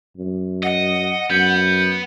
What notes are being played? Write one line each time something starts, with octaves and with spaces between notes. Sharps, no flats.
F#2
D#5 F#5
F#2 B3 G6